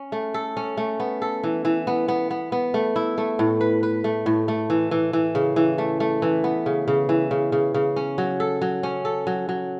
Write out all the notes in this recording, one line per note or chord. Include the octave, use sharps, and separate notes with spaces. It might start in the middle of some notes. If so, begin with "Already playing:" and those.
Already playing: C#4
A3
A4
C#4
A3
B3
A4
E3
E3
B3
B3
B3
B3
A3
E4
A3
A2
B4
B4
A3
A2
A3
E3
E3
E3
C#3
E3
A3
A3
E3
B3
C#3
C#3
E3
C#3
C#3
C#3
C#4
F#3
A4
F#3
C#4
A4
F#3
F#3